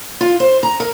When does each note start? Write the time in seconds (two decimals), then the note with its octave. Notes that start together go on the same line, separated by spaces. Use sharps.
0.21 F4
0.40 C5
0.63 A#5
0.80 A#4